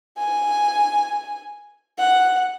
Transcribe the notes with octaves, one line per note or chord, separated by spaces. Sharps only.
G#5
F#5